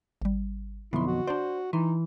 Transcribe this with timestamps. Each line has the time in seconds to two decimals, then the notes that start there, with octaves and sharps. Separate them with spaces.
0.22 G#1 G3
0.93 B1 F2 B2 D3 E4 C6
1.07 F#4
1.27 D4 C5 D5
1.73 E3 D#4 C6